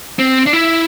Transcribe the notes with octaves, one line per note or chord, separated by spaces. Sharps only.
C4
D4
E4